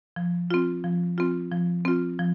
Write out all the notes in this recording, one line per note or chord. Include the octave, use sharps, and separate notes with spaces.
F3
C4 F4
F3
C4 F4
F3
C4 F4
F3